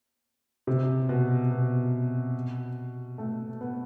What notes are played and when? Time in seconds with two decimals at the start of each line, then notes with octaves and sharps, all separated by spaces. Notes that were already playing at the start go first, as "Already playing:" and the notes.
0.67 C3
1.09 B2
1.51 B2
3.18 A3
3.61 B3